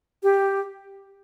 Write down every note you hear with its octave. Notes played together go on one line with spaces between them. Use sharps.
G4